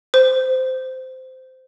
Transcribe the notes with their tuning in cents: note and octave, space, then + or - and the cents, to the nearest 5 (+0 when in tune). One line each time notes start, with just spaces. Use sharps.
C5 -15